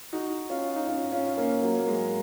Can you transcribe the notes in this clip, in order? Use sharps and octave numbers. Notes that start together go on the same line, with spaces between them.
D#4 F#4
C#4 F4
D#4
C#4 F4
C#4 F4
A#3 C#4
F#3 A#3
A#3
G#3